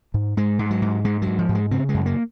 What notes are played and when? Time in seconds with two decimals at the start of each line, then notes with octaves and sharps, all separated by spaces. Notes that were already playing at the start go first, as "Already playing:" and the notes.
0.14 G#2
0.37 G#2 G#3
0.59 G#2
0.71 F#3
0.82 G#2
1.04 G#2 G#3
1.22 G#2 F#3
1.39 F3
1.49 G#2
1.55 G#3
1.71 C#3 C4
1.89 G#3
1.94 F#2
2.06 A#3